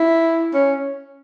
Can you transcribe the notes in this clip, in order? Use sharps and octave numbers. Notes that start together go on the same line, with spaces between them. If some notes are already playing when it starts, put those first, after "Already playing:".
Already playing: E4
C#4